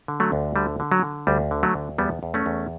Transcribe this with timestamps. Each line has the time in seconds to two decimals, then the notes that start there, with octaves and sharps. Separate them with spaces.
0.08 D3
0.20 F#3 A3
0.32 D2
0.56 D3 G3
0.80 D3
0.92 F#3
1.03 D3
1.27 D2 G3
1.51 D3
1.63 F#3 A3
1.74 D2
1.98 E2 G3 B3
2.23 E2
2.34 A3 C#4
2.46 E2